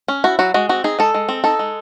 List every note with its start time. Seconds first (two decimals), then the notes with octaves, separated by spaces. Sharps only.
0.08 C#4
0.24 E4 F#4
0.39 F#3 F#4
0.54 G#3 F#4
0.69 C4 F#4
0.84 D#4 G#4
0.99 G#3 A4
1.14 G#3
1.29 C4
1.44 D#4 A4
1.59 G#3